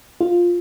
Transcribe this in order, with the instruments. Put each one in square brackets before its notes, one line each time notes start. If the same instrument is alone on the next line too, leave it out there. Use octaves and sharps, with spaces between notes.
[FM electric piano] F4